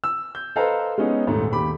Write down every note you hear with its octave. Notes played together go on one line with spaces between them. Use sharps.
E6
G6
A4 B4 C5 D#5 F5 A#5
G#3 B3 C#4 D#4
D#1 G#2 A3
D#2 G4 B5 D6